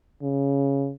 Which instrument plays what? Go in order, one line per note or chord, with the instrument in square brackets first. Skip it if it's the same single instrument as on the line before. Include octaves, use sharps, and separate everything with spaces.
[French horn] C#3